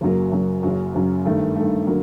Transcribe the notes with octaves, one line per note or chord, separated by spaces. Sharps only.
F#1 F#2 F#3 A#3
F#1 F#2 F#3 A#3
F#1 F#2 F#3
F#1 F#2 F#3
G2 D#3 A3
G2 D#3 A3
D3 F#3 A#3